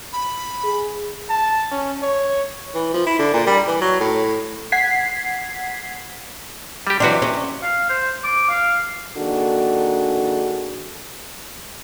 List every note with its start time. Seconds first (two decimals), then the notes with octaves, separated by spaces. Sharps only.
0.13 B5
0.64 G#4
1.29 A5
1.72 C#4
2.02 C#5
2.75 E3
2.94 F3
3.07 E4
3.19 D3
3.33 A#2
3.47 G3
3.67 E3
3.81 F#3
4.00 A2
4.72 F#5 G#6 B6 C7
6.87 G3 G4
7.00 C3 E3 F#3 D4 F#4
7.22 C#4
7.63 F5
7.90 C5
8.24 D6
8.49 F5
9.17 D#3 A#3 D4 F#4 G#4 A4